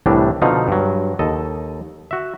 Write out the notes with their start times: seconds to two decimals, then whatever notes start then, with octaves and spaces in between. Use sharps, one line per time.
0.06 C2 A2 E3 G3 D4
0.42 B2 D3 F3 D#4 F5
0.68 G2 F#3
1.19 D#2 A4 D#5
2.11 F#4 E5